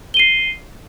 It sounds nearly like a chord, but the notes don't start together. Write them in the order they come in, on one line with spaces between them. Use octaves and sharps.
G7 D#7 C7